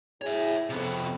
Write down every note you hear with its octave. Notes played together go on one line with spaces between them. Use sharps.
B2 E4 G#4 C#5 E5
F2 C3 B3